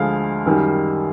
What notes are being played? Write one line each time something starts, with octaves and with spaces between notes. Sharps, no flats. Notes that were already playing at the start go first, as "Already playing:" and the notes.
Already playing: D2 D3 F3 G#3 F5
F#2 D#3 G3